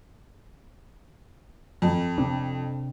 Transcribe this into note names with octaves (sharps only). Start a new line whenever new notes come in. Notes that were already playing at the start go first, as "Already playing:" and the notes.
F2
C3 C4 D4